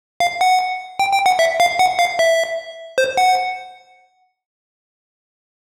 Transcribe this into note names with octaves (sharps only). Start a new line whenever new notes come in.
F5
F#5
G5
G5
F#5
E5
F5
F#5
F5
E5
C5
F#5